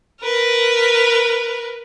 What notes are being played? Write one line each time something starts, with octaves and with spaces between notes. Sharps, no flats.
A#4 B4